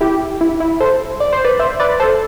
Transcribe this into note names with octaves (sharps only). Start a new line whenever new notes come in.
E4 G4
E4
E4
A4 C5
D5
C5
B4 D5
C5 E5
B4 D5
A4 C5